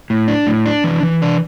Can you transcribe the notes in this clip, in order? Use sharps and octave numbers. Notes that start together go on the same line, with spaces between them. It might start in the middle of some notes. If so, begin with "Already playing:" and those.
A2
D4
A2
D4
E3
E3
D4